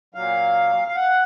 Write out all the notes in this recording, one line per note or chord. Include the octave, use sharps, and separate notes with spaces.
A#2 F#3 F5
F5
F#5